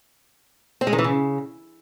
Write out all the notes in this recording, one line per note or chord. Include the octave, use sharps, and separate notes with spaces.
C4
G#3
D#3
E3
C#3